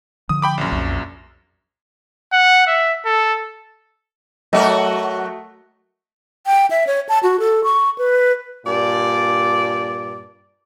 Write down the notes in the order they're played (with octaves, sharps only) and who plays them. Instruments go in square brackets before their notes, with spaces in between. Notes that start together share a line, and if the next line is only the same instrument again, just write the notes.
[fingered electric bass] D3 F3 [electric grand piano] D#6
[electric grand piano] G5 B5 D6
A#1 F#2
[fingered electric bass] B1 F2
[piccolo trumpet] F#5
E5
A4
[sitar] F#3 F#4 A#4 [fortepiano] A3 D#5
[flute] G5
E5
C#5
A5
F#4
A4
C#6
B4
[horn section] G2 A#2 D5